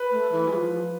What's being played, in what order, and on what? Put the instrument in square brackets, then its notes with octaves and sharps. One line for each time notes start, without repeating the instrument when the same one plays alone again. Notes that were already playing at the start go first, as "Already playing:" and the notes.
Already playing: [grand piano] B4
[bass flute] A3
E3
G#3
F3